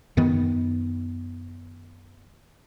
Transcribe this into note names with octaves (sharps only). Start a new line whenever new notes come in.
F#2 D#3 B3